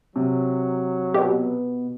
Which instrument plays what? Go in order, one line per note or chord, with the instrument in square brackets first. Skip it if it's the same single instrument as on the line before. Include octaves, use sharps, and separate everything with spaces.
[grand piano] C3 [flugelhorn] F#3
[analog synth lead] B2 [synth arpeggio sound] G4